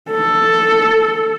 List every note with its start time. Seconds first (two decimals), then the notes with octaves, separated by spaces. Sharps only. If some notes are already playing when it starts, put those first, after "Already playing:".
0.11 A4